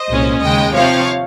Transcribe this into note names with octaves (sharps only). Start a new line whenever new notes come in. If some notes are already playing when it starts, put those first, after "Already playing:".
Already playing: C5 D#5
C2 A#2 G#3 C#4
D#2 C#3 G#3 D#5 G5
C3 F3 C4 C#5 F5